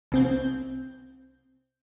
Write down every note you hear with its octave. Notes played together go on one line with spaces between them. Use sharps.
C2 C4 G6